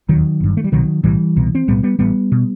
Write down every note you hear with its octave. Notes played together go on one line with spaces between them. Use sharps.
E1 D#2 D#3 F#3
G1 G2
A3
G3
C2 B2 D#3 F#3
B1 A2 E3 G3
C2 B2
C4
B1 A2 G3 B3
G3 B3
A1 A2 G3 B3
B2